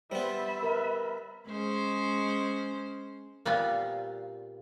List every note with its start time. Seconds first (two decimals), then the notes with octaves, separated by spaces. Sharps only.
0.12 G3 B3 C5 E5 B5
0.63 A#4 B4
1.48 G#3 C#4 C5
3.45 A#2 G3 B3 C4 F4